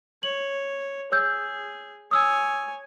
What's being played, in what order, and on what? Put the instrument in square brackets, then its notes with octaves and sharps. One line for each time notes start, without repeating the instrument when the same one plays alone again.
[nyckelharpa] C#5 [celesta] F#7
[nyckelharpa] G#4 [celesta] C#5 E6 G6
[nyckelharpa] C#5 G#5 [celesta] D#6 E6